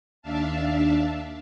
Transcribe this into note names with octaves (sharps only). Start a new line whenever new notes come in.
D#2 D4 E5 F5 A5